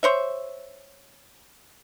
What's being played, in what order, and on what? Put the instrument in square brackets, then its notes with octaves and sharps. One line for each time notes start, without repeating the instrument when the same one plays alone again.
[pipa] C5 C#5 E5